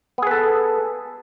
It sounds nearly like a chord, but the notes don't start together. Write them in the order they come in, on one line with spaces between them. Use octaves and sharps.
B3 G#4 B4 A4